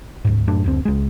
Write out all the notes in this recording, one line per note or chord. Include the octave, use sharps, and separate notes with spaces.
D1 G#2
F#1 F#2 A2 D4
F#1 D2 C4
C#2 G#3